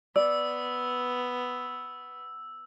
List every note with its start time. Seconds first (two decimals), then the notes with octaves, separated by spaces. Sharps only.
0.16 B3 D5 E6